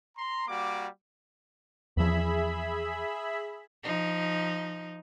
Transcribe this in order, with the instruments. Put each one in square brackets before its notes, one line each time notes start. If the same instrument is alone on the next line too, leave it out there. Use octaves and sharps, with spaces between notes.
[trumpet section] A#5 C6
G3 A#3 F#4 D6
[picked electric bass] E2 F3 [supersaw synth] G#4 E5 B5
[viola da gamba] F3 D#4